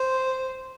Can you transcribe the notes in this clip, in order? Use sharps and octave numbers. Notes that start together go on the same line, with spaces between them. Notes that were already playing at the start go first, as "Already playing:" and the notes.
Already playing: C5